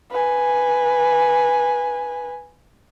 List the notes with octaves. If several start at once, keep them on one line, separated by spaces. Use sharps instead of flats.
B4 G#5